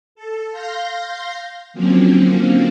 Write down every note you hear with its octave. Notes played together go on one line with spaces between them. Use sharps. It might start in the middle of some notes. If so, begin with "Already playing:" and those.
A4
F5 C6 G6 A#6
D3 F3 F#3 A#3 C4 C#4